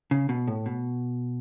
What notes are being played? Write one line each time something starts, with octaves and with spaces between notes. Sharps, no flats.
C#3
B2
A2
B2